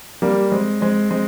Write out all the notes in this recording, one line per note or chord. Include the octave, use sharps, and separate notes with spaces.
G3 A#3
G#3 C4
G#3 C4
G#3 C4